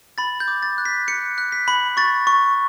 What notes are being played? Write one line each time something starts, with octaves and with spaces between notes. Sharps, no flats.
B5 A6
G6
D6
A6
F#6
B6
F#6 C#7
F#6
B6
B5
C#6 A6
C#6